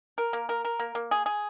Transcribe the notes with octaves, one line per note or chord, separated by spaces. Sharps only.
A#4
A#3
A#4
A#4
A#3
A#3
G#4
G#4